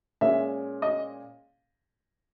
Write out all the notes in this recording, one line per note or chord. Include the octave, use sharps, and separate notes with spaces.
A#2 G#3 C#4 E5
D#5